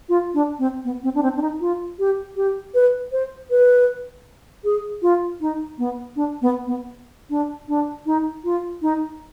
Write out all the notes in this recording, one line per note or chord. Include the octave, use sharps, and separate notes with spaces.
F4
D4
C4
B3
C4
D4
C4
D4
D#4
F4
G4
G4
B4
C5
B4
G#4
F4
D#4
B3
D4
B3
B3
D4
D4
D#4
F4
D#4